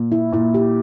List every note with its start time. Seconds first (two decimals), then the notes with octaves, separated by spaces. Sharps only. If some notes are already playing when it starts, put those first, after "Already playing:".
Already playing: A#2
0.12 E4
0.32 A#2 E4
0.54 G4